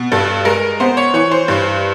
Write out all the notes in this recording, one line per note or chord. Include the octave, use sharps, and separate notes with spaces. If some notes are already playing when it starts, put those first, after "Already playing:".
Already playing: B2
G2 A4
G#3 A#4
B3 C5
C#5
E3 C#5
C5
G2